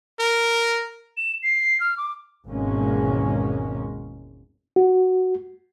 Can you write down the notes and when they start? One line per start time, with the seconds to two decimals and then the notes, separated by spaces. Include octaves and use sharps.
0.19 A#4
1.17 E7
1.43 C7
1.80 F6
1.97 D6
2.46 G#1 E2 B2 G#3 A#3 C#4
4.76 F#4